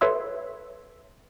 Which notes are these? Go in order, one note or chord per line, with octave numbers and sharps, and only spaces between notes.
A4 B4 C#5 E5 C6 E6